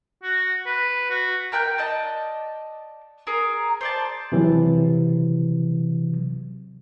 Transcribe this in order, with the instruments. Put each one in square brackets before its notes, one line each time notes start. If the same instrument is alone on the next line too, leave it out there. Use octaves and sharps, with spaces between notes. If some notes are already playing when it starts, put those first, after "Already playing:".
[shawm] F#4
B4
F#4
[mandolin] A#4 G5 F#6 G6
D5 D#5 A5
G#4 A#4
C5 D5 A5
[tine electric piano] C3 E3 F#3